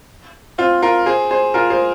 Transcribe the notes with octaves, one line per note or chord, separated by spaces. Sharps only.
C4 F4
F4 A#4
G#4 C5
G#4 C5
F4 A#4
G#4 C5